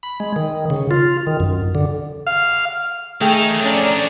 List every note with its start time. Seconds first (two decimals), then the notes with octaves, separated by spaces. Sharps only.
0.03 B5
0.20 G#3
0.36 D#3
0.70 C#3
0.91 F4
1.27 D#3
1.40 F#2
1.75 D3
2.27 F5
3.21 D#3 A3 D#4 G#4 G5
3.62 F3 C#4 D4 D5 A#5